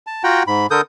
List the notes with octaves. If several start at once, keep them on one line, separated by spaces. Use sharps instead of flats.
A5
F4 F#4 F#5 G5 A#5
G#2 B5
D3 A4 A#4 D#6 G6